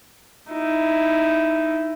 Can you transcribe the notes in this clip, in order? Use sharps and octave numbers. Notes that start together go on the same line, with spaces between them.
D#4 E4